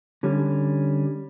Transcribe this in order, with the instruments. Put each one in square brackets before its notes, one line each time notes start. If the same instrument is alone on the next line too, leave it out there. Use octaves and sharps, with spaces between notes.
[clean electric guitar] D3 G3 C#4